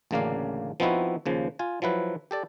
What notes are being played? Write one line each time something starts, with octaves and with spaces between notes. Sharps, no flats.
A1 D2 C#3 A#3 D4 F5
F3 B3 C4 D#4 E4 F#4
D#2 C#3 F3
F4 G#5
F3 F#3 E4 B4
G4 A4 D5